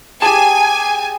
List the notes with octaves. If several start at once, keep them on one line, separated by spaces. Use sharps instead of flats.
G4 G#4 G#5 A5